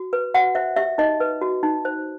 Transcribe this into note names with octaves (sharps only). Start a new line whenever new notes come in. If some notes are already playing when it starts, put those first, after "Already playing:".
Already playing: F#4
B4
F#4 F#5
C5 E5
G4 E5
D#4 D#5
B4
F#4
D#4
C5